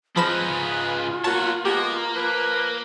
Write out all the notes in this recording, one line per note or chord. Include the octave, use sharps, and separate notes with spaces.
F3 C4 D#4 F4 G#4 B4 B5 E7
G#2 C#3
A#3 B3 F#4 C#5 A5
F3 G#3 A#3 B3 G4
F3 B4